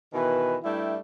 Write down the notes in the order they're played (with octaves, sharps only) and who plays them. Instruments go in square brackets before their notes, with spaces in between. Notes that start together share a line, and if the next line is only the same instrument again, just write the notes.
[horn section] B2 D#3 E3 B4 G#5
G2 G3 A3 E4 G5